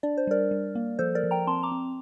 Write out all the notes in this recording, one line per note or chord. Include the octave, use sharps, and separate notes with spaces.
D4 D5
C5
G3 A#4 D5
G3
A#3
F3 A4 C5
A#4 D5
F3
G5 A#5
C4 A5 C6
A#5 D6
C4